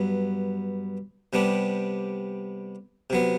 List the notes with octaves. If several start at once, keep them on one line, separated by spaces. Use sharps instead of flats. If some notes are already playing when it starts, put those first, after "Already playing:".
Already playing: G2 F#3 B3
C3 G3 B3 D4
C3 F#3 B3